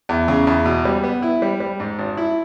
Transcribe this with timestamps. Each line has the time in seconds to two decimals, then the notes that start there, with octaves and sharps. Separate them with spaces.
0.09 E2
0.28 C#3
0.47 E2
0.65 B2
0.85 G3
1.03 B3
1.22 E4
1.42 G3
1.60 G3
1.80 G#2
1.99 G#1
2.17 E4